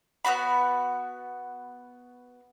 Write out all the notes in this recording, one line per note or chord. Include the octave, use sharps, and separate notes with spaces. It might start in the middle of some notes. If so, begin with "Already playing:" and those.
B3 C4 F#4 B5